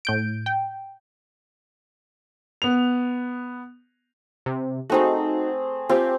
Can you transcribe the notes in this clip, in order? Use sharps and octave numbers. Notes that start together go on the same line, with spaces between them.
A2 G6 D7
G5
B3 F7
C3
A3 C4 D#4 F#4 G#4
C4 F4 G4